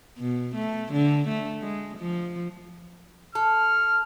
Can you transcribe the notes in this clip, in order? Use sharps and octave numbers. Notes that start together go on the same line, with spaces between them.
B2
A3
D3
A3
G#3
F3
A4 F6